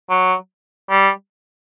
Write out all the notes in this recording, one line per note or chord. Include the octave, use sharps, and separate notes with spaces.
F#3
G3